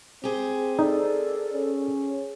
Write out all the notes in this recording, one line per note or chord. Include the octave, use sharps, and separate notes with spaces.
C4 G4 G#4 C5
D#4 A4 A#4 D5
C#4